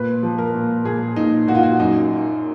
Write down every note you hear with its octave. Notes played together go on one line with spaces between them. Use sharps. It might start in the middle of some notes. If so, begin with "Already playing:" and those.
Already playing: A#2 B4
F3
A#4
A#2
A#2 G#4
A#2 D#4
A#2 F#4
F4
F#4
F#2 D#4